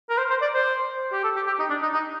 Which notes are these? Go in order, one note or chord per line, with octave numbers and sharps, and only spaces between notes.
A#4
C5
C5
D5
C5
G4
A4
G4
G4
D#4
D4
D#4
D#4